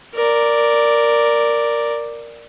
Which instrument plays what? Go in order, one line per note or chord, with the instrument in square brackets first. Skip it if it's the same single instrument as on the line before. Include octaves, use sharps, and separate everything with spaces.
[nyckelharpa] A#4 D5